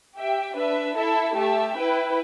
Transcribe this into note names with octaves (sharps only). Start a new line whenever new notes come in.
G4 E5 G5
D4 B4 E5
E4 A4 E5 A5
A3 G4 E5 A5
E4 B4 G5